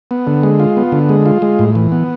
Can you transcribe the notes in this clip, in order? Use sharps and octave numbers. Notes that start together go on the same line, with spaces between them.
B3
D3
G#3
F4
B3
D3
G#3
F4
G#3
A2
E3
B3